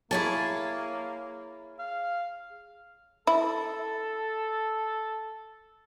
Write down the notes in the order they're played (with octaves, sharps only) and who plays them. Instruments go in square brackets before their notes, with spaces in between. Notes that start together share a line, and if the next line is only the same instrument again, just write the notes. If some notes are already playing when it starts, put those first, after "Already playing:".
[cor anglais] A#3 [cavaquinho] E4 A5 [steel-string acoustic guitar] G#4 C#5 G#5
[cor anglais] F5
[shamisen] E4 [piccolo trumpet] A4